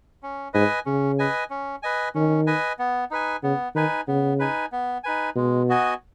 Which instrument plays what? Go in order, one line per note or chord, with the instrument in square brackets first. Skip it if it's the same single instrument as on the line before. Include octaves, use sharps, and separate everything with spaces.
[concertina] C#4
[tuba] G#2 [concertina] B4 D#5 G#5
[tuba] C#3 [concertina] C#4
[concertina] B4 D#5 G#5
C#4
B4 D#5 G#5
[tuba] D#3 [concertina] C#4
[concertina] B4 D#5 G#5
B3
D#4 B4 G#5
[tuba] C#3 [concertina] B3
[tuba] D#3 [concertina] D#4 B4 G#5
[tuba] C#3 [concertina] B3
[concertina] D#4 B4 G#5
B3
D#4 B4 G#5
[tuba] B2 [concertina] G#3
[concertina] B3 F#4 D#5 G#5